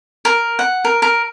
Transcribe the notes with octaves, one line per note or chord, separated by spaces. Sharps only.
A#4
F#5
A#4
A#4